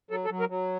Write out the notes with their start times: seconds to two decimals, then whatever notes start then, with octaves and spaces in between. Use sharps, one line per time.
0.11 F#3 A4
0.25 A4
0.30 F#3
0.40 A#4
0.50 F#3